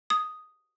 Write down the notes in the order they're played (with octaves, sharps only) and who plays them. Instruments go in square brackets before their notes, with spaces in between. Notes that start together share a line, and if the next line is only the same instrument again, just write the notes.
[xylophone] D#6